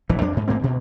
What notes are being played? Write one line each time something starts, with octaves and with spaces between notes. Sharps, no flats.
F1 A#1 E3
F2 F#3 D4
D2 G#2
A1 G#2 A#3 C4
D2 B2